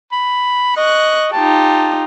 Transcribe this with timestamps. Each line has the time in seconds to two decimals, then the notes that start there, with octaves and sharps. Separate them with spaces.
0.12 B5
0.77 D#5 C#6 F#6
1.33 D#4 F4 G4 A5